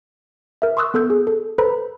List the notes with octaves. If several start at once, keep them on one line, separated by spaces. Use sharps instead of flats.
A#4 E5
C6 C#6 D#6 E6 F#6
B3 A4 E6 G6
G#4
A4
A4 B4 C5 A#5 B5